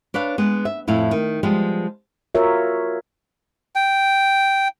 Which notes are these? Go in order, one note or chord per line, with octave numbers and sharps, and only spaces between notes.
D4 B4 C#5 F5
G#3 B3
E5
F2 A2 E4 F5
D#3
F3 G3 G#3 B3
F4 F#4 A#4 C#5 E5
G5